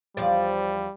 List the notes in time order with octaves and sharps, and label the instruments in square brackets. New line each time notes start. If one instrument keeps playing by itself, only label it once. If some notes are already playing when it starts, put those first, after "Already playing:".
[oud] E2 F3 D5 [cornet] G3